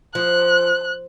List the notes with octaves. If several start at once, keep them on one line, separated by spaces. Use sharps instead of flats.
F3 F#6